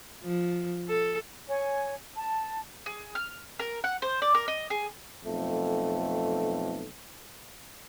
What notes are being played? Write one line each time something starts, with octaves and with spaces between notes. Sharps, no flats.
F3
A4
C#5 G#5
A5
G#4
F6
A#4
F#5
C5
D5
A#4
D#5
G#4
B1 F2 A3